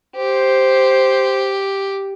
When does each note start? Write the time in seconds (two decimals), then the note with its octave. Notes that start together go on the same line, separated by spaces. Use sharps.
0.16 G4 C5